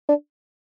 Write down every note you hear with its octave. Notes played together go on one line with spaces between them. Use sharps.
D4